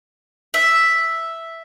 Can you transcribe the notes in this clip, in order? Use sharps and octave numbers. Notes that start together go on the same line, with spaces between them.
E5